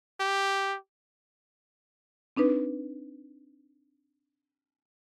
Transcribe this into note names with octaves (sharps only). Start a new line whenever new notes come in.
G4
C4 D4 D#4 B4